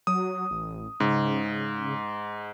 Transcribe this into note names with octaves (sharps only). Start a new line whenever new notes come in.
F#3 D#6
A1
G#2 C#3